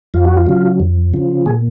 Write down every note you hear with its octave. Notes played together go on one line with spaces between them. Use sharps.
F2 F4
F#4
F4
C#3 F#3
F2
C#3 F3
A#2 G#4